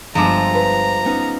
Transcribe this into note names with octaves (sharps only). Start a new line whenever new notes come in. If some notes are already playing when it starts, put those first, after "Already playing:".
G1 F3 G#3 A4 A#5 D6
B4
B3 C#4 D#4